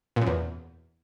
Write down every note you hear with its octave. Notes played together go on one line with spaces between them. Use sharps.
A#2
F#2
E2